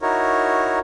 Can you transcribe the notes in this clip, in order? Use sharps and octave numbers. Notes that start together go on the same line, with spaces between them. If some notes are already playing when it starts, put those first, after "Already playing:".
D#4 E4 F#4 A#4 C#5